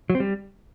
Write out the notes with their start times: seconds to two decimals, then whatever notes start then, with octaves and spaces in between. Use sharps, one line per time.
0.10 F#3
0.15 C4
0.20 G3